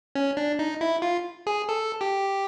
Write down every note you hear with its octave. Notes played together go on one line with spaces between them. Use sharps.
C#4
D4
D#4
E4
F4
G#4
A4
G4